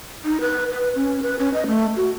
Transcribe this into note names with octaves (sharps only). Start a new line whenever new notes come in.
D#4
B4
B4
C#4
B4
C#4
D#5
A3
F#4